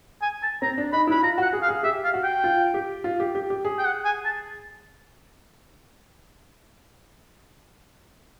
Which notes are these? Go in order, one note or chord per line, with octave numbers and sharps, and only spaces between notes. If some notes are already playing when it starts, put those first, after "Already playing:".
G#5
A5
C4 A#5
D4
D#4 B5
E4 B5
F4 A#5
F#4 F#5
G#4
F5
G#4
G4 E5
F5
F#4
G5
F4
G4
F4
G4
G4
G4
G#4
G5
F#5
G#5
A5